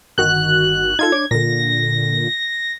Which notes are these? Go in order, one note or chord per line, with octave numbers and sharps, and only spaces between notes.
G1 D#3 F#4 F#6
D#4 F4 A4 G#6
D4 C#5 D6
A#2 D3 A#6